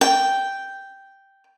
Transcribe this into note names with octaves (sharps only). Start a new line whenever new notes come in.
G5